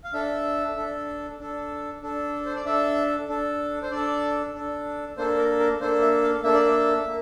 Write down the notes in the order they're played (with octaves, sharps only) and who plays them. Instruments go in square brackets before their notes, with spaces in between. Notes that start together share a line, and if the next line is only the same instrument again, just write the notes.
[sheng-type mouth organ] F5
D4 A4 E5
D4 A4
D4 A4
D4 A4
C5
D5
D4 A4 E5
D4 A4
C5
D4 A4 D5
D4 A4
A#3 D4 A4 C5
A#4
A#4
A#3 D4 A4 C5
E5
F5
A#3 D4 A4 E5
D5
E5
A#3